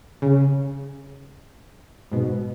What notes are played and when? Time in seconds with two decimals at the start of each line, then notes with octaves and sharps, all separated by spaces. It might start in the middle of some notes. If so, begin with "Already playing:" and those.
0.22 C#3
2.11 G#2 B2